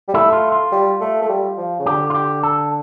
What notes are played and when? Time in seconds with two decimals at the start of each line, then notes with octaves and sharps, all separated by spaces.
0.08 G3
0.14 A3 E4
0.33 F4
0.52 F4
0.72 G3
1.00 A3
1.22 A3
1.29 G3
1.57 F3
1.79 C#3
1.86 D3 G4
2.10 F4
2.14 G4
2.43 A4